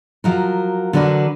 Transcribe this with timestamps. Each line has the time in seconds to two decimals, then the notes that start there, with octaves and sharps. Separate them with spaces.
0.24 F3 F#3 A#4
0.93 D3 F#3 D4 A#4 B4